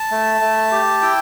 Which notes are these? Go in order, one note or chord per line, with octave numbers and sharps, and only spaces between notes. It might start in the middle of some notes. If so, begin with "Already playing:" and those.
Already playing: A5
A3
A3
G4
E4 G5